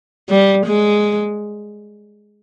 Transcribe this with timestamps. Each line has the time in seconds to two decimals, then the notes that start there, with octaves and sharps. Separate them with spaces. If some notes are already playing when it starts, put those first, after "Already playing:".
0.29 G3
0.66 G#3